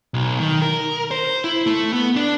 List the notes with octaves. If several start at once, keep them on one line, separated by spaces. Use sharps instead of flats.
B1
D#3
A#4
C5
E4
A3
B3
D4